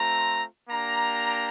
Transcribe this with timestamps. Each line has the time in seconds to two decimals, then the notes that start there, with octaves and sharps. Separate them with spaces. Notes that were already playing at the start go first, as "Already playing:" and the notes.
Already playing: A3 C4 F4 A#5
0.70 A#3 D4 G4 A#5